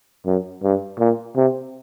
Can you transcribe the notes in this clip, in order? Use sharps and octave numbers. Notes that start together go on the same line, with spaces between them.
F#2
G2
A#2
C3